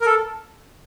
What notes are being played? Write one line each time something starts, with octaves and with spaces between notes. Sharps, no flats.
A#4
A4